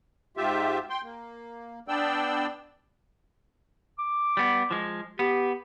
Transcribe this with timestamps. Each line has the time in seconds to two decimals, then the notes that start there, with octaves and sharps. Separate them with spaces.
0.37 G#2 F4 G4 E5
0.90 G5 C6
1.03 A#3
1.88 B3 D4 D5 G5 E6
3.99 D6
4.37 G3 B3
4.71 F3 G#3
5.19 B3 G4